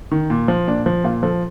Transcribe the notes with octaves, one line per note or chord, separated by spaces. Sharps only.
D#3
A#2
F3
A#2 D4
F3
A#2 F4
F3 A4